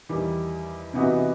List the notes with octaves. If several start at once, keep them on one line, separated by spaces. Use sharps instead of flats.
E2 D#3 G3
C3 E3 B3 D#4 F#4